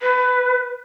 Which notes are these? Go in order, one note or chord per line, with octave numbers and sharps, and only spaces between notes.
B4